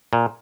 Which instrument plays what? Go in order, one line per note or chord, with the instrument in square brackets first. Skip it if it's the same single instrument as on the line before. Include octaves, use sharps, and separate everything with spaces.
[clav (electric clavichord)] A#2